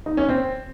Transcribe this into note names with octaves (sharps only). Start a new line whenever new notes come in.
D#4
C#4
C4